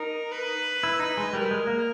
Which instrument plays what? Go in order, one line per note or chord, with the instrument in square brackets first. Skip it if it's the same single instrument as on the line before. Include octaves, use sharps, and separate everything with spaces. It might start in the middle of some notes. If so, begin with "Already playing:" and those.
Already playing: [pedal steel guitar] D#4 [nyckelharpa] A#4
[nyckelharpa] B4
[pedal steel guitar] E4
D#4
G#3
[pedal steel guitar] G3 [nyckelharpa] A#4
[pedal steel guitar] G#3
A#3